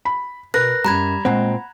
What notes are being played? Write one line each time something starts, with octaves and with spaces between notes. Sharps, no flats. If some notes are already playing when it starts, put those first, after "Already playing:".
B5
B2 A#4 B4 F#6 A#6
F#2 G3 A#5 B5 G#6
A#2 G#3 C4 F#5